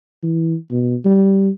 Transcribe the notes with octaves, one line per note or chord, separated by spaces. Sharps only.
E3
B2
G3